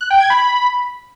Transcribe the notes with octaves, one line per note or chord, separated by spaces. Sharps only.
F#6
G5
G#6
B5